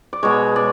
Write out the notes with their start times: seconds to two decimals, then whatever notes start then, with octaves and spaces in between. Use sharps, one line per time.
0.13 D5
0.23 B2 G#3 C#5
0.56 D5